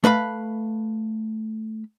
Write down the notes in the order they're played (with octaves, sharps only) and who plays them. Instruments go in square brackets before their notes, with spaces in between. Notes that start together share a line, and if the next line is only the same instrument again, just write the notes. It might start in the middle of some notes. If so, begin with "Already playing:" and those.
[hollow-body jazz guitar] A3 B4 F5 B5